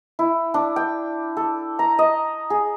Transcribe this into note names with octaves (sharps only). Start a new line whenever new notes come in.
E4
D4
G5
A4
A#5
D#5
G#4